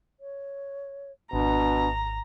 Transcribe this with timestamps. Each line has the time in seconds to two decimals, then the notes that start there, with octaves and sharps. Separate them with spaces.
0.20 C#5
1.33 G#1 B2 D4 A#5